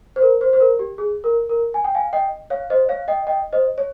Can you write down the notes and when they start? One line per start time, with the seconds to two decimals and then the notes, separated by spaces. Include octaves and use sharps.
0.16 C5
0.22 A#4
0.41 C5
0.53 C5
0.60 A#4
0.79 G4
0.98 G#4
1.24 A#4
1.49 A#4
1.74 G#5
1.84 G5
1.95 F5 G#5
2.13 D#5 G5
2.50 C#5 F5
2.70 C5 D#5
2.89 C#5 F5
3.08 D#5 G5
3.27 D#5 G5
3.53 C5 D#5
3.78 C#5